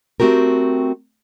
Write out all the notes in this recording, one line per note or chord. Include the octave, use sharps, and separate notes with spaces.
A3 C4 F#4 G4 A#4